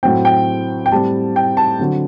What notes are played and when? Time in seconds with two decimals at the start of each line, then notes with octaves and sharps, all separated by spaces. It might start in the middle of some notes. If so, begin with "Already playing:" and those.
0.03 A2 F#3 C4 G5
0.25 G5
0.86 G5
0.91 A2 G3 C4 A5
1.36 G5
1.57 A5
1.79 D3 F#3 C4